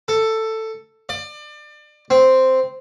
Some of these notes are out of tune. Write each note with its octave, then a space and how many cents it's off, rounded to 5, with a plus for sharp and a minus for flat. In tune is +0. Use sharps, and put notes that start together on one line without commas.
A4 +10
D5 +30
C4 -5